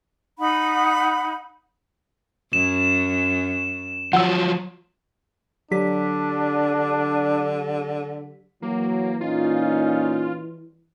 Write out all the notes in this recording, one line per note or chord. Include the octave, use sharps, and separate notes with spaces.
D#4 F#5 B5
F#2 E7
F3 F#3 F#5 E6
D3 F#3 D4 G4 B6
E3 F#3 A#3
A#2 C#4 D#4 F4